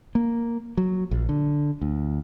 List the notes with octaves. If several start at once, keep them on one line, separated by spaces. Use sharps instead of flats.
A#3
F#3
A#1
D3
D2